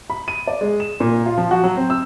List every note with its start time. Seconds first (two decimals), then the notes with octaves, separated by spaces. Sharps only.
0.10 B5
0.28 D#7
0.47 D5
0.61 G#3
0.80 E7
1.00 A#2
1.26 F4
1.37 F3
1.51 F#4
1.64 F#3
1.76 C4
1.90 E6